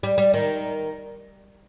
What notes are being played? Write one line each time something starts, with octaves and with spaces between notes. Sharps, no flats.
G3
G3
D#3